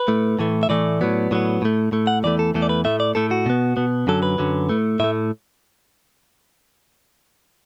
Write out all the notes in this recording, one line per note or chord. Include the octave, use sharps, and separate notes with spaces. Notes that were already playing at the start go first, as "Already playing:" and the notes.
Already playing: B4
A2 A3
A2 E3 A3
E5
A2 E3 A3 D5
A2 F#3 B3
A2 F#3 B3
A2 A3
A2 A3
F#5
E2 E3 A3 D5
A4
E2 E3 A3 A4
D5
B4
A2 A3 E5
D5
A2 A3 A4
F#4
B2 B3
B2 B3
F#2 D3 F#3 A4
B4
F#2 D3 F#3
A2 A3
A2 A3 E5